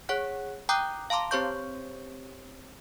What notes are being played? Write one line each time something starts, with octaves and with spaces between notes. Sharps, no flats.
G#4 C#5 F#5 F#6
G5 A#5 D6 D#6 F#6 G6
F5 A5 A#5 C6 D6
C4 G4 C5 C#5 C#6 G6